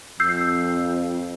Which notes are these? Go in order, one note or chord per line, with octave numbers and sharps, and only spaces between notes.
F2 E6 G6 C7